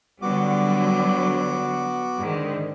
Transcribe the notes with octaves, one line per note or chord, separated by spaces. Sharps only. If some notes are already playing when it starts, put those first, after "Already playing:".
D3 F#3 G3 B3 F#4 D6
G#2 D3 D#3